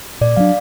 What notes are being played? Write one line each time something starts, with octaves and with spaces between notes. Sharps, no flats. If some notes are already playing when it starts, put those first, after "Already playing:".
A#2 D5
F#3 A#3 D4 F5